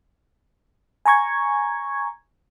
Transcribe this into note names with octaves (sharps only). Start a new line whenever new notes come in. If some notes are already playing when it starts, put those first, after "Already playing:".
G#5 A#5 C#6 G#6